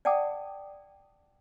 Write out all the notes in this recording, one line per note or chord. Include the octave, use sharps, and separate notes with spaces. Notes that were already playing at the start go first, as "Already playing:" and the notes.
D5 F#5 G5 A5 D6 D#6